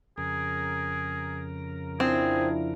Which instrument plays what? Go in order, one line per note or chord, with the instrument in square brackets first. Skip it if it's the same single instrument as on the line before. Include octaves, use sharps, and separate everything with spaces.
[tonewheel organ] F2 C#3 A#4 [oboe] G#4
[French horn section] F3 D4 E4 [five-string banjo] C4 [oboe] G#4